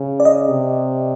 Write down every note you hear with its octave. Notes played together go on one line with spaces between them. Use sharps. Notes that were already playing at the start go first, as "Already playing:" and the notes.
Already playing: C#3
D5
D#5
C3